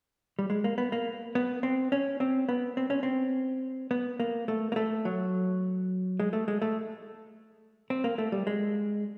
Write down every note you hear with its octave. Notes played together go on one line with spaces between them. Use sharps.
G3
G#3
A#3
B3
A#3
B3
C4
C#4
C4
B3
C4
C#4
C4
B3
A#3
A3
A#3
A3
F#3
G#3
A3
G#3
A3
C4
A#3
A3
G3
G#3